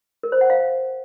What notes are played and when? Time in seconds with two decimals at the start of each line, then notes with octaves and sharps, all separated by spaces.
0.23 A#4
0.32 C5
0.41 F#5
0.50 F5